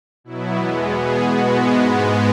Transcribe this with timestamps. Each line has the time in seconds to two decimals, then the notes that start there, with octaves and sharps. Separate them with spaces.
0.24 B2 F#3 B3 E4
0.56 E2 E3 G#3 B3 F#4
0.90 B2 B3 G#4
1.22 B2 G#3 B3 F#4
1.54 G#2 G#3 B3 E4
1.87 G#2 G#3 B3 F#4